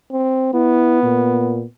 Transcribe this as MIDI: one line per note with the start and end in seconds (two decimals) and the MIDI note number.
0.12 0.52 60
0.54 1.68 59
0.54 1.00 64
1.03 1.63 46